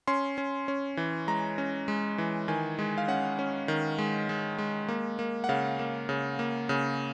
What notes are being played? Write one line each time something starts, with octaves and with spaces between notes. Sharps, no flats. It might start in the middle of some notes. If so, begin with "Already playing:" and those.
C#4 C6
C#4
C#4
E3
G#3 A#5
C#4
G#3
E3
D#3 G#5
G#3
F5
C#4 F#5
C#4
D#3
G#3
G#3
G#3
A#3
A#3
F#5
C#3 F5
A#3
C#3
A#3
C#3